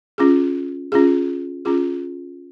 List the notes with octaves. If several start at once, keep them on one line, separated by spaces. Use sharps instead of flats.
C#4 F4 G#4
C#4 F4 G#4
C#4 F4 G#4